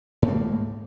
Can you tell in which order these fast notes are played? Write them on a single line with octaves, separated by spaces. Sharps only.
G#2 A3 A#3